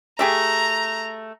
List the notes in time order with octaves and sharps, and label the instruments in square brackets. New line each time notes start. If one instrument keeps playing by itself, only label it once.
[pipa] A3 G4 G#4 [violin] A#5